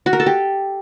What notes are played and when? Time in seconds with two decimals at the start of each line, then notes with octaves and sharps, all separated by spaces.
0.06 F#4
0.13 A#4
0.20 A4
0.26 G4